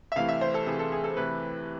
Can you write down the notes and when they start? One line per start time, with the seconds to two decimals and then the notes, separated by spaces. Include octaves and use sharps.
0.12 E5
0.16 C3 E3 A3 E4 F5
0.28 E5
0.41 C5
0.54 A4
0.67 C3 E3 A3 E4 G#4
0.79 A4
0.92 G#4
1.04 A4
1.17 C3 E3 A3 E4 B4